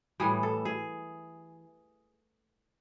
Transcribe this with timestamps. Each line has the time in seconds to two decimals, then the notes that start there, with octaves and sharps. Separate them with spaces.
0.20 A2 E3 G3 G#4
0.43 A4
0.65 G#4